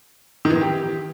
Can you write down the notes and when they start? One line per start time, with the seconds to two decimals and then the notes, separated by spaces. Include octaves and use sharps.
0.45 D#3
0.50 E3
0.56 D#3
0.61 G4